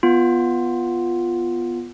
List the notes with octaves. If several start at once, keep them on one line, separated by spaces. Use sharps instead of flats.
B3 F4